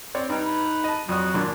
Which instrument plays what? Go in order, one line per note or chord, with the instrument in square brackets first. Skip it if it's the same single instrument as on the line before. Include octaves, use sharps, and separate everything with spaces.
[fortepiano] C4 C#5 D5
[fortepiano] G2 [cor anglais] G3 [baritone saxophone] D#4
[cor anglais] B4
[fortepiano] D#5 A5
[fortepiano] F2 D5 D#6 [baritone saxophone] F#3 [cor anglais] F#4
[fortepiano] G#1 A#2 D4